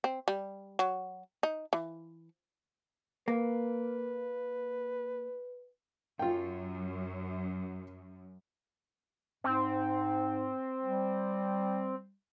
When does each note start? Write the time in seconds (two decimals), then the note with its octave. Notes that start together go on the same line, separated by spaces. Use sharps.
0.04 C4
0.28 G3
0.79 F#3
1.43 D#4
1.73 E3
3.28 A#3 B4
6.19 F#2 F4 G5
9.44 G#2 C4
10.83 G3